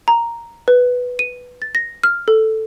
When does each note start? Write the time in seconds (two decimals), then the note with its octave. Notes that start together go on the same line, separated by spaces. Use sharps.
0.08 A#5
0.68 B4
1.19 D#7
1.62 A6
1.75 A#6
2.04 F6
2.28 A4